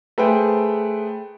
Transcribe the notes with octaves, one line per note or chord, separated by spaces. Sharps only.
A3 G#4 B4 C5 G5